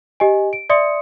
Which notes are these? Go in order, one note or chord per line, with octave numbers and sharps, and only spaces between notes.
G4 D#5 G#5
D7
D5 E5 C6 D#6 C#7